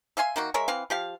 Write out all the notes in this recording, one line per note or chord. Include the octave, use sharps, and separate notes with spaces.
E5 F5 G#5 C6
D#3 A#3 F#4
G#3 A#4 C#5 E5
E3 C4 F5
F3 G4 F5